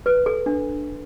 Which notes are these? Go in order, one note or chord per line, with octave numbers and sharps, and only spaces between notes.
B4
A4
D4